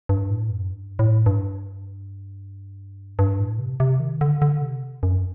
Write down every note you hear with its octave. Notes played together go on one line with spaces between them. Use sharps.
G2
A2
F#2
G2
A2
G2
G2
A2
C3
C3
D#3
D3
D3
C3
F#2